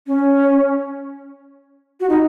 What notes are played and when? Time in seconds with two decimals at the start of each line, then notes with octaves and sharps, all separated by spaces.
0.07 C#4
2.00 F#4
2.09 D#4